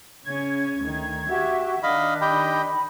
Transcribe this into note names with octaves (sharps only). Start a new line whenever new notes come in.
C#3 C#4 G#6
D2 D#3
F#4 G4 E5
D#3 D4 D#5 F5 B5
G4 D#5 G5 B5